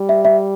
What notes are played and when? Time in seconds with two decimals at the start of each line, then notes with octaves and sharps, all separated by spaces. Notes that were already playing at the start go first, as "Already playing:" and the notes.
Already playing: G3
0.09 E5
0.25 E5